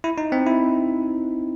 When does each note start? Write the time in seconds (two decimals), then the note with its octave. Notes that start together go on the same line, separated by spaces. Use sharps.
0.04 E4
0.18 D#4
0.32 C4
0.46 E4